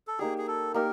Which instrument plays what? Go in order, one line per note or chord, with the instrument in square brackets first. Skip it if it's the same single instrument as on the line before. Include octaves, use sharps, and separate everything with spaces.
[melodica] A4
[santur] A#3 D#4 G4 [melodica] G#4
[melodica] G#4
A4
[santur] A#3 D#4 G4 [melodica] A#4